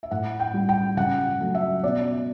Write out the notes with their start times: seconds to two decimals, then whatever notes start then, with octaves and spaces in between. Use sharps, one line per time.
0.03 E5
0.11 A2 F#5
0.40 G5
0.54 G3
0.69 G5
0.97 C#3 F#5
1.40 F#3 A3
1.55 E5
1.83 B2 D5